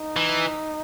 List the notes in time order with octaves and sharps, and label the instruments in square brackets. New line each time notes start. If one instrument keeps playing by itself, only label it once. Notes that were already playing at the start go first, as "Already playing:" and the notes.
Already playing: [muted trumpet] D#4
[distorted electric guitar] E3